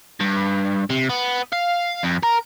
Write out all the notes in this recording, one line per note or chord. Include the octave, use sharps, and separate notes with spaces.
G2
C3
B3
F5
F2
A#4